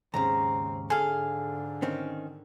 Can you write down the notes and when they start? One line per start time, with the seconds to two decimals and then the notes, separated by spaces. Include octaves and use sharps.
0.14 D#2 G#2 C#3 C4 A#5
0.90 G#2 D3 G#4 A4 F5
1.82 D#3 C4 C#4